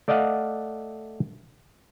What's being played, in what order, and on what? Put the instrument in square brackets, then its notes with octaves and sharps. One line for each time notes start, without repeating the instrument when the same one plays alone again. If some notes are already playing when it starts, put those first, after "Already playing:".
[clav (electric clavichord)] A3 D5 D#5 F5 F#5